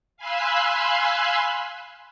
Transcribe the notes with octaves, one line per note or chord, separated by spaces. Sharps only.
F5 G#5 B5 C6 E6 F#6